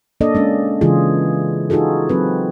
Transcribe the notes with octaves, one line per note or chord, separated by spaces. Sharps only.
A#3 D4 A4 D5 D#5
G#3 C#4 D4
C#3 E3 G#3 F4 G#4
D#4 F4 F#4 G#4 A4
F#3 C4 B4